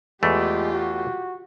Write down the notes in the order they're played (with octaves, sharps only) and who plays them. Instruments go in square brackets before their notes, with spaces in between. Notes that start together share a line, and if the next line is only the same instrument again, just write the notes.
[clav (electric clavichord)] E2 E3 A3 [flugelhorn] G#3 [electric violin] F4 G4
[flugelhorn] F#4